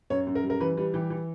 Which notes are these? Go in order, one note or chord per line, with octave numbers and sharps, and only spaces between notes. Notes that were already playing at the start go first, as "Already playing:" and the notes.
F#2 C#5
F#2
A#4
G3
A#4
E3 B4
G3 B4
E3 G4
E3